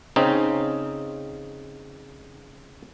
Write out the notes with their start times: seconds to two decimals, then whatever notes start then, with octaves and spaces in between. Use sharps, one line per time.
0.16 C#3 C4 C#4 D#4